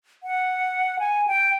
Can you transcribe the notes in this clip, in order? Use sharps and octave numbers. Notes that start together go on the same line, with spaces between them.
F#5
G#5
G5